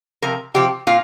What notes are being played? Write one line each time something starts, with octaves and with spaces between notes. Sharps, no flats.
C3 F3 A#4
C3 F3 G4
A#2 F4